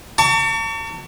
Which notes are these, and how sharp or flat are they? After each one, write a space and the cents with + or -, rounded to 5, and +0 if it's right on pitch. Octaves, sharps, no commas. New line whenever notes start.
A5 +45 C#6 +35